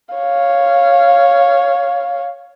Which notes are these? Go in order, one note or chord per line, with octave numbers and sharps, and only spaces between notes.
C#5 F5